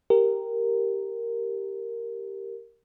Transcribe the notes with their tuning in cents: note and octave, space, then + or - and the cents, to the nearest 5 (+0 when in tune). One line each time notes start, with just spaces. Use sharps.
G4 +0 A#4 -5